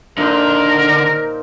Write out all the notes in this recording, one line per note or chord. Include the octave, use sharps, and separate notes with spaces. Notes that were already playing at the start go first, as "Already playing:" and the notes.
A#2 D3 D4 D#4 A#4 C5